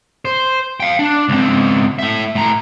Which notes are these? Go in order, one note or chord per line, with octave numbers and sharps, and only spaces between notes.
C5
F5 G5
D4
C#2 C4
A2 E5
A2 A#5